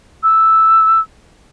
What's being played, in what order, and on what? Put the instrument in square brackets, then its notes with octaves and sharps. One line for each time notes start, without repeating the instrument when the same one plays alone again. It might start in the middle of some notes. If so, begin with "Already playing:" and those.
[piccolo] E6